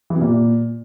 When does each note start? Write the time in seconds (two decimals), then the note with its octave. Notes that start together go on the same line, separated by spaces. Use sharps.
0.10 E3
0.16 C3
0.21 A#2